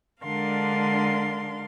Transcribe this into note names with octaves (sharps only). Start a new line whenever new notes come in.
D3 G#3 D4 A#4 F5 C6